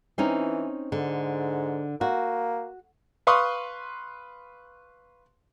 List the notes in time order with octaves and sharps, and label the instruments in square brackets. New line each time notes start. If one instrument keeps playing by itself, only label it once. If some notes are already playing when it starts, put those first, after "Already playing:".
[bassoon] E3 [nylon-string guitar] C4 C#4 D#4
[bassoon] G#2 [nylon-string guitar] D3
[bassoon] A#3 [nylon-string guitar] F#4
[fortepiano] B4 F5 C6 C#6 D#6